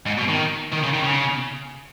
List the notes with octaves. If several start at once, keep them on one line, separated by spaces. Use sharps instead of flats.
G#2
B2
D#3
D#3
C#3
D#3
C#3